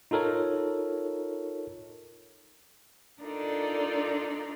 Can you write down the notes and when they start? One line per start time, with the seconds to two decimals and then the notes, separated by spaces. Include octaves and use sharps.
0.11 D#4 F4 A4 A#4 C#5
3.22 D4 D#4 F4 A4 A#4 D5